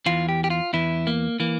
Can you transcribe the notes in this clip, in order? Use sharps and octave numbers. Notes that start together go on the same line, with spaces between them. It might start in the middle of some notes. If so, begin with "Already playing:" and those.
E2 E3 F4
G4
G4
F4
E2 E3 E4
A#3
E3 A#3